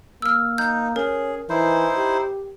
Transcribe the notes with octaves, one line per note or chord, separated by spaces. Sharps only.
A#3 E6 F6
D#4 G6
C#4 G#4 A#4
E3 D#4 E4 C5
G4